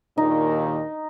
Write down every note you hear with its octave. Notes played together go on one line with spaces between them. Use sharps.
D#2 A#2 D#3 D#4